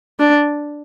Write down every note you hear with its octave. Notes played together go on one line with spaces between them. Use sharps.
D4